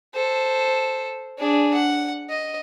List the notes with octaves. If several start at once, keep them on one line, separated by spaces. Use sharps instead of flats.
A4 C5
D4 G#4
F#5
D#5